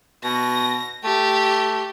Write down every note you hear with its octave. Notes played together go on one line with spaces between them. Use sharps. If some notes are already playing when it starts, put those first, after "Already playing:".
B2 A#6
A3 G4